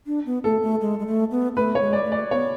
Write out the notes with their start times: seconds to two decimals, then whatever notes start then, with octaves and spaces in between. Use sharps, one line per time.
0.06 D4
0.26 B3
0.44 A3 A4
0.62 A3
0.81 G#3
0.99 G#3
1.07 A3
1.31 B3
1.56 A3 B4
1.75 C#5
1.81 G#3
1.93 D5
2.05 A3
2.12 D5
2.31 B3 C#5